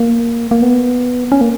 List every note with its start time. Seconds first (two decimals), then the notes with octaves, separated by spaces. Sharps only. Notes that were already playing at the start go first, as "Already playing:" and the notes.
Already playing: A#3
0.51 A#3
0.62 B3
1.32 C#4
1.41 A#3